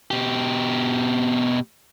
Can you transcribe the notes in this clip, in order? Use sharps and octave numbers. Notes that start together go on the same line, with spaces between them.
B2 G4